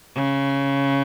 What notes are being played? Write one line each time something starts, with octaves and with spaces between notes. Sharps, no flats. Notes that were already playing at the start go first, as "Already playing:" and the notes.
C#3